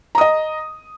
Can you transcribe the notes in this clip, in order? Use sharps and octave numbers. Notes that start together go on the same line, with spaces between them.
D#5 A#5 D#6